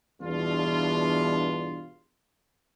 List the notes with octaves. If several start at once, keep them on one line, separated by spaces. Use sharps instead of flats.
E2 G2 B2 D4 F4